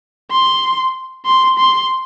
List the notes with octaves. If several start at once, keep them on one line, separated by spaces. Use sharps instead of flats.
C6
C6
C6